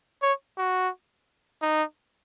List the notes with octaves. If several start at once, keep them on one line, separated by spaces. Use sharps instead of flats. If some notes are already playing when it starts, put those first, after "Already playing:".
C#5
F#4
D#4